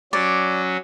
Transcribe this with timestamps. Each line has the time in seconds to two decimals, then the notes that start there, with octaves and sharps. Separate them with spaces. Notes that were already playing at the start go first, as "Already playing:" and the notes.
0.13 F#3 C#4 D5